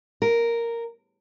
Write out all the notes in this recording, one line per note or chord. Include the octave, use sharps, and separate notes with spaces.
A#4